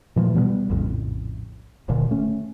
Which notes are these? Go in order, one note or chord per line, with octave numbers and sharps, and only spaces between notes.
A#2 E3 F3 A3
B2 G3 A3 B3
A#1 F2 A2 C#3
D1 A#2 D3 D#3
A3 C#4